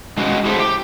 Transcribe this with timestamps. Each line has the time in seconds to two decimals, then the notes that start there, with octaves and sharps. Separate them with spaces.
0.17 G#3 C#4 F#4 B4 D#5
0.45 E4 G#4 A4 C5 E5
0.59 G4